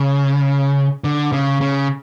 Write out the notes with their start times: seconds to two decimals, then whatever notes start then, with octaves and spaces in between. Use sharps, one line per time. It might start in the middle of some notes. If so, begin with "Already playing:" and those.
Already playing: C#3
1.04 D3
1.32 C#3
1.61 C#3